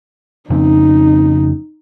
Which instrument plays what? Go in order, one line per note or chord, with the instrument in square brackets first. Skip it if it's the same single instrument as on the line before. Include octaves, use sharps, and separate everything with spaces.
[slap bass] F2 C#3 C4 [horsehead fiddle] D#4